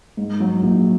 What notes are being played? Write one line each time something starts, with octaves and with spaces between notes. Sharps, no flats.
G#2
F#3
A#1